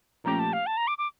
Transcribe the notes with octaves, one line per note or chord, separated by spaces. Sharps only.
A#2 F3 A3 C#4 G4 A#5
A5
F5
A5
A#5
D6
D6